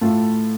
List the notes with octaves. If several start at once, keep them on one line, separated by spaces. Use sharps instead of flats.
A2 A3 F4